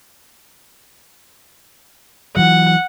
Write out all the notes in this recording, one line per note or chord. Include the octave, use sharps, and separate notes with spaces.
E3 F#3 F#5